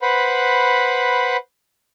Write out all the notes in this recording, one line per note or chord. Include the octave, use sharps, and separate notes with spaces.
B4 C5 F#5 B5